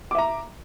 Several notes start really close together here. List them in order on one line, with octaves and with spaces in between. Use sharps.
D6 E5 A#5